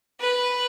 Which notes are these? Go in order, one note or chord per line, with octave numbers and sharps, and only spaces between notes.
B4